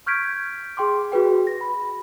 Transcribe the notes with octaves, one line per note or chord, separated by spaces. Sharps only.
C#6 F6 G6 G#6 B6 D7
G#4 G5 C6 D6
F#4 G#4 B4 G5
A#6
B5